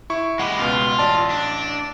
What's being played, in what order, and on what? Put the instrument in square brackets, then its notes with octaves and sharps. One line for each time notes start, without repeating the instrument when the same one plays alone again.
[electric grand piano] E4 C#6
[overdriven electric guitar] G#3 G4 [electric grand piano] F#5 B5
[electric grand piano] C#2 B2 [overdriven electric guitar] F4
[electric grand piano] A1 D5 A5
[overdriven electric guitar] D4